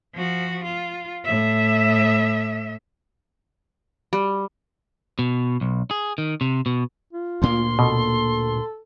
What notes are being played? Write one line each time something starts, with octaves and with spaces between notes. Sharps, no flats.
F3 F#4
F4
A2 E5
G3
B2
B1
G#4
D#3
C3
B2
F4
D2 A#2 A#3 C6
B2 A4